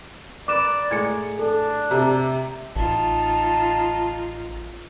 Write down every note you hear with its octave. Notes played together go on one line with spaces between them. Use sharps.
A#4 B4 D5 D6 E7
A2 G#3 A#4 G#6 C#7
D4 A4
C3 A#5
A1 D#4 F4 A5